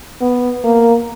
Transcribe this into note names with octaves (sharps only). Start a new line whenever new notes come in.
B3
A#3